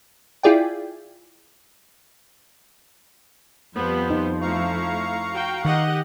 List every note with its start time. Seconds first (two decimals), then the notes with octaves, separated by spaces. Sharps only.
0.43 E4 F4 G#4 D5 G5
3.75 F2 F3 G3 B3 C5
4.10 D#4
4.41 A3 E4 F5 A#5 C#6
5.34 F#4 G5
5.65 D#3 G4 D#5 F#5